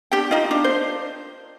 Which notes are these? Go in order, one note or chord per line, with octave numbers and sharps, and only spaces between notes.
D4 G4 G5
D#4 F4 D#5
D4
C5